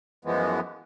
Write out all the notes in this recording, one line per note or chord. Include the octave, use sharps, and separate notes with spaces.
F#2 E3 F3 G#3 B3